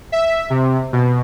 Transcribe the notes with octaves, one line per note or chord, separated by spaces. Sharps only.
E5
C3
B2